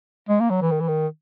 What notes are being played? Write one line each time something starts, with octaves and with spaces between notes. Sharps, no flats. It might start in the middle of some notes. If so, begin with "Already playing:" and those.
G#3
A#3
F#3
E3
D#3
E3
D#3